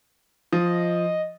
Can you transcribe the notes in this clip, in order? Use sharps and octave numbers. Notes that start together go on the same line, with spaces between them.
F3 D#5